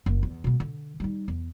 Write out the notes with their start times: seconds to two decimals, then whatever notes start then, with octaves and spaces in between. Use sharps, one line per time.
0.06 F#1 A#3
0.23 E2
0.44 B2 G#3
0.60 D3
1.00 G3 D#4
1.28 E2